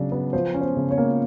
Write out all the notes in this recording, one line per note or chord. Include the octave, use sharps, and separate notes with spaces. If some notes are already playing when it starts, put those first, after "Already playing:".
Already playing: C#3 F#3 D4
B3
F3 C5
C#4
C5
C#3
C#5
A#3